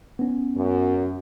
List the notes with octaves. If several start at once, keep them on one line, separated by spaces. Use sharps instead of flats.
B3 C#4
F#2